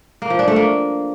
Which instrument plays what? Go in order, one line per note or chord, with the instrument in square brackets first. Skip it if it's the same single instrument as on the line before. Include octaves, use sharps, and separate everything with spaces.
[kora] A#3
F3
D4
A3
A#3